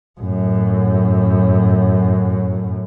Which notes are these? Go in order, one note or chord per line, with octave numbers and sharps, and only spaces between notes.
F#2 A2